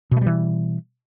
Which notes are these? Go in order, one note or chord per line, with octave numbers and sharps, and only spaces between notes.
B2 E3 G3 A3